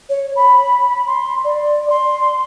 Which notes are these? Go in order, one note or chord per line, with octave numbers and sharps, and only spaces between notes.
C#5
B5
C6
D5
C6